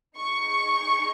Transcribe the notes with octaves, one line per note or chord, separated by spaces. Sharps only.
D#4 G#4 C#6